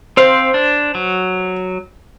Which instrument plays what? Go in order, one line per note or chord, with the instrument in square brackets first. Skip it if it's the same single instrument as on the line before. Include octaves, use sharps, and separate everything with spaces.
[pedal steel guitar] C4 F5 [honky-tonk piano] C5
[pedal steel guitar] D4
F#3